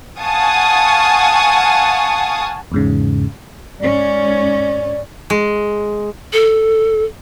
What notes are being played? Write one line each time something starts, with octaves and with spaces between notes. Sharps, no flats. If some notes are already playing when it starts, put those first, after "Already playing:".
F5 F#5 G#5 A5 C#6 D#6
E2 G#2 C#3
G#2 C#4 D5
G#3
A4